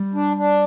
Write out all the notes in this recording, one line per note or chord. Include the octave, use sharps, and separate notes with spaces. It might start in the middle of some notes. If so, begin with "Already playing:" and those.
Already playing: G3
D4
D4